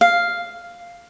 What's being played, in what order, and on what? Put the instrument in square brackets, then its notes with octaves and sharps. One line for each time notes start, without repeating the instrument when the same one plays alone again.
[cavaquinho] F5